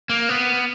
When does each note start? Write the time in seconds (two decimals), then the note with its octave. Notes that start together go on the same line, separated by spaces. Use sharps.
0.09 A#3
0.29 B3